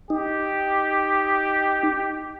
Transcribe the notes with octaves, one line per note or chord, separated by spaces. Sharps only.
D#4 G4